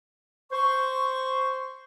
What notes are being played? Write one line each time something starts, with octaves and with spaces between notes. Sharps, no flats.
C5 C#6